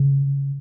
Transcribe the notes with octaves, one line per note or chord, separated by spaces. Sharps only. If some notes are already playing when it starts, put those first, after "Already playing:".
Already playing: C#3